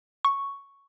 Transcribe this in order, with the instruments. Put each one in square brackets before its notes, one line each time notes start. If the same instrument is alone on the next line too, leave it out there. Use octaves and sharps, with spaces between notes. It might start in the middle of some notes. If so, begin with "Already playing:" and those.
[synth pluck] C#6